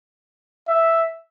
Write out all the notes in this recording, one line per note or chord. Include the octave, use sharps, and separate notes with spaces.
E5